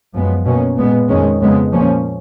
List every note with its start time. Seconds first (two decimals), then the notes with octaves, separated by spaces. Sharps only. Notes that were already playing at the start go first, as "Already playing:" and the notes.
0.13 F#2 F3 G#3 B3
0.45 B2 A#3 C#4
0.76 A#2 G#3 B3
1.08 F2 D#3 G#3 C#4
1.41 F2 C#3 G#3 B3
1.72 A#2 F3 A#3 C#4